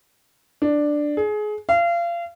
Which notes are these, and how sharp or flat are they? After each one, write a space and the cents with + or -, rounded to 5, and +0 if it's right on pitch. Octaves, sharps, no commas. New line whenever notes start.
D4 +5
G#4 +25
F5 -30